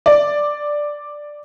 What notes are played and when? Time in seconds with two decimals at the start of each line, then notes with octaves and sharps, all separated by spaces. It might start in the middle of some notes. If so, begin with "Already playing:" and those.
0.06 D5